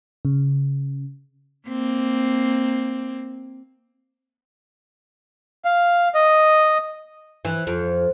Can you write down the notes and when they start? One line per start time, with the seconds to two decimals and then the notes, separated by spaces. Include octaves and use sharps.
0.25 C#3
1.68 A#3 C4
5.65 F5
6.14 D#5
7.45 E3
7.67 F2